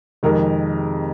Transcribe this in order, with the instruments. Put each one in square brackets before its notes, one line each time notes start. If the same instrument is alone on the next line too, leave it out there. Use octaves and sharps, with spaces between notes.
[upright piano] F2 C3 D#3 G#3 A#4